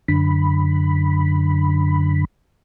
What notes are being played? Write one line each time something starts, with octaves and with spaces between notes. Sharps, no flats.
F#2 D3 B5